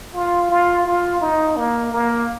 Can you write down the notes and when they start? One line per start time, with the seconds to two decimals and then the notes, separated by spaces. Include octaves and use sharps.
0.15 F4
0.50 F4
0.86 F4
1.21 D#4
1.56 A#3
1.92 A#3